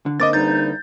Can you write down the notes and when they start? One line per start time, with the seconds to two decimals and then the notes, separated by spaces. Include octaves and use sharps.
0.06 D3
0.20 D3 A#3 C4 D#5 D6 A6
0.33 E2 G3 D#4 G6 A6